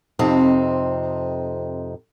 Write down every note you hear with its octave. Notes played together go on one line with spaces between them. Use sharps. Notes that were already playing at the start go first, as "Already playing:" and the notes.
F2 C3 C4 D#4